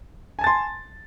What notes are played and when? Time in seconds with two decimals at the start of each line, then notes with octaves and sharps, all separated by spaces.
0.39 G#5
0.41 A5
0.44 A6
0.47 C6